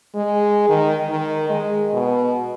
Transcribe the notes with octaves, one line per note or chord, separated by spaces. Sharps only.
G#3
D#3
D#3
G#3
B2